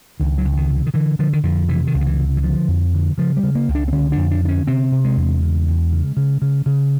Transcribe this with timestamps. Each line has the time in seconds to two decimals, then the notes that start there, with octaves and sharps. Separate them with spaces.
0.20 C#2 D#3
0.38 F#3
0.45 C#2
0.52 E3
0.57 D#3
0.70 C3
0.76 E3
0.86 D#3
0.94 D3 E3
1.19 D3 F3
1.33 D#3
1.43 F2 D3
1.68 C3 E3
1.87 D#3
1.94 C#2
2.01 D#3
2.06 E3
2.18 C3
2.37 E3
2.43 D3 F3
2.68 F2
2.93 D3
3.18 C#3 F3
3.37 G3
3.43 C#3
3.55 A#3
3.69 C#2
3.75 D4
3.88 C4
3.92 D3 C#4
4.12 D4
4.18 F2
4.31 D4
4.43 D3 D4
4.48 C#4
4.67 C3 C4
4.92 C3
5.05 G#3
5.17 E2
5.43 C#3
5.68 E2
5.92 C#3
6.17 C#3
6.42 C#3
6.66 C#3